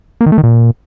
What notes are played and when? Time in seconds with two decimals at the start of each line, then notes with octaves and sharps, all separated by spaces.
0.21 A#3
0.26 D#3
0.32 A3
0.38 D#3
0.44 A#2